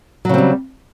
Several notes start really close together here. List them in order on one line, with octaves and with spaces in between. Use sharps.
F#3 C#3 C4 G3